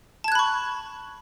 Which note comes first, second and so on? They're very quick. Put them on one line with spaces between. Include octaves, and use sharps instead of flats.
A5 G#6 F#6 B5 C#6